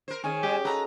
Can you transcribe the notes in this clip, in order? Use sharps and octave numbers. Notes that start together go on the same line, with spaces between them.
A#4 C5
D#3 C#4 G#4 G#5
G3 G4
F#4 A4 B4 D#5 A#5